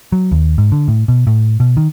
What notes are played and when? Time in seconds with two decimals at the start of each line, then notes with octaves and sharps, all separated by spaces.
0.12 F#3
0.32 D#2
0.58 G#2
0.72 D3
0.88 A2
1.08 B2
1.27 A2
1.60 B2
1.77 D#3